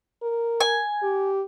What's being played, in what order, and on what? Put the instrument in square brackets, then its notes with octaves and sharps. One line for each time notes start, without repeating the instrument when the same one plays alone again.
[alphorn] A#4
[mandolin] G#5
[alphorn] G4